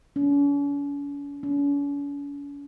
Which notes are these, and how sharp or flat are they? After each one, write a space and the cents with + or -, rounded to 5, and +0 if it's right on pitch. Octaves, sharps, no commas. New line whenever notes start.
C#4 +45
C#4 +45